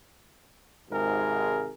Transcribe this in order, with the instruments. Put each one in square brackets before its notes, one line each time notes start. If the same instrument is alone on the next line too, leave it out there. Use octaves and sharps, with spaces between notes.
[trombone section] G#1 G#2 C3 G#4 A#4